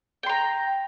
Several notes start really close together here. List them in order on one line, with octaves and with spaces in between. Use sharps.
G5 C6 A#5